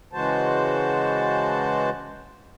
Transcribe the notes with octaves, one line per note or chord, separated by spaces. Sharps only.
C#3 E3 G#3 F#4 C5 A5